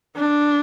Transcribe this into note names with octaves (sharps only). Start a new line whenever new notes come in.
D4